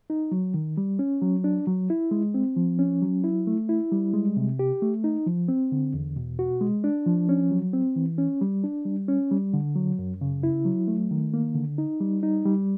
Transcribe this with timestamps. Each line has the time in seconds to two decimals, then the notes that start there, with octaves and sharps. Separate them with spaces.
0.10 D#4
0.32 F#3
0.54 D#3
0.77 G3
0.99 C#4
1.22 F#3
1.44 D4
1.67 F#3
1.90 E4
2.11 G#3
2.34 C4
2.56 F3
2.79 C#4
3.02 F#3
3.24 E4
3.47 A3
3.69 E4
3.92 G3
4.14 G#3
4.37 C3
4.59 G4
4.82 A3
5.04 D#4
5.26 F3
5.48 C4
5.72 D3
5.94 E2
6.16 B2
6.39 F#4
6.61 G#3
6.84 D4
7.06 F3
7.29 C#4
7.51 F#3
7.73 C4
7.96 E3
8.18 C#4
8.41 G3
8.64 D4
8.85 G3
9.08 C#4
9.31 G3
9.54 D3
9.75 F#3
9.99 F#2
10.21 C#3
10.43 E4
10.65 F#3
10.88 A3
11.11 D#3
11.34 A#3
11.55 D3
11.78 D#4
12.00 G3
12.23 D#4
12.46 G3